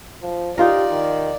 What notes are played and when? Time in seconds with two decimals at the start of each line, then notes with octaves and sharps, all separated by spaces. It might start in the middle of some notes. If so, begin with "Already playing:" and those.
0.23 F3
0.58 D#4 F4 G4 A#4 D5
0.91 D#3